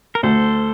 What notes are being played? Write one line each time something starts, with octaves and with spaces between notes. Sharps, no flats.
A#4
D2 A4 C5